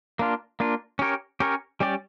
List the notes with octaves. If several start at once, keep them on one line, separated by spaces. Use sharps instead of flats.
A#3 D4 F4
A#3 D4 F4
C#4 G4 A#4 C#5
C#4 G4 A#4 C#5
G3 C#4 G4 D5